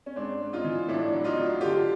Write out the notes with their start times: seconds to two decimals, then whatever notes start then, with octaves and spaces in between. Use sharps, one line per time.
0.06 C#4
0.16 G#2 C4 D4
0.41 G#2
0.53 D#4 F4
0.64 E3
0.88 A2 D4 E4
1.12 F#3
1.24 D#4 F4
1.37 F#3
1.61 D3 F4 G4